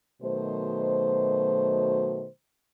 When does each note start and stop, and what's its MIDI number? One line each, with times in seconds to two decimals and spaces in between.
0.23 2.27 47
0.23 2.27 51
0.23 2.27 54
0.23 2.27 57
0.23 2.27 72